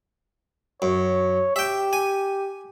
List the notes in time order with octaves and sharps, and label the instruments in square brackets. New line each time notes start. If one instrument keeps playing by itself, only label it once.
[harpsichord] F#2 [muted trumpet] C#5
[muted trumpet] G4 [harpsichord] E5 G5
[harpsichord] G#5